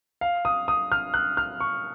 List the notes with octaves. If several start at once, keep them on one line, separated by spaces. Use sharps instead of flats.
F5
D#6
D#6
F6
F#6
F6
C#6